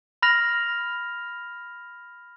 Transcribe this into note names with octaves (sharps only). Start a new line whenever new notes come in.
B5 F6 A#6 F7